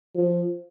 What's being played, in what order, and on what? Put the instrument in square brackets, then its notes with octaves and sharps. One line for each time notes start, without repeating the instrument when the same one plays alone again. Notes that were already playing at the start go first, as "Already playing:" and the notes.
[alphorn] F3